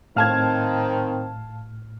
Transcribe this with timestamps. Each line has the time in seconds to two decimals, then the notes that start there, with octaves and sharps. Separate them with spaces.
0.16 A2 D#3 C4 F5 A5 F6 G#6